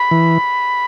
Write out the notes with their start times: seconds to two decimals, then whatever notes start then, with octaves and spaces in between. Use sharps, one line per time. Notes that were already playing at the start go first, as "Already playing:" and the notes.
Already playing: B5
0.11 E3